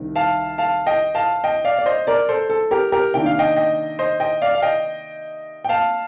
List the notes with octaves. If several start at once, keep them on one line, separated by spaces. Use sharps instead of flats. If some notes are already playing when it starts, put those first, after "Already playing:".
Already playing: C2 C3 D#3
F5 A5
F5 A5
D#5 G5
F5 A5
D#5 G5
D5 F5
D5
C5 D#5
A#4 D5
A4 C5
A4
G4 A#4
G4 A#4
C3 D#3 A#3 D4 G5
F5
D#5 G5
D#5 G5
C5 D#5
D#5 G5
D5 F5
F5
D#5 G5
G5
F5 A5